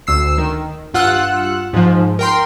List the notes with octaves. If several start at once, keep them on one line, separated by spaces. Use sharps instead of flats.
D2 E6 C7
D#3
G2 F4 F#5 E6 F#6
G#2 F3
A#4 G5 C6